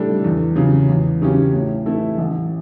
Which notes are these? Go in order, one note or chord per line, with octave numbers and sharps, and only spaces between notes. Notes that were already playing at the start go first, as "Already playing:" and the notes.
Already playing: A2 G3 D4 A4
E2
C#3 F#3
E2
C#3 F#3 C#4 G4
A2
E3 A3 E4 A4
A1